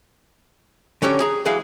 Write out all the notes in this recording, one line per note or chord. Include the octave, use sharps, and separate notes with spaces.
D3 F#3 C#4 G4 C#5
G#4 A#5
E3 F#3 G#3 G#4 F5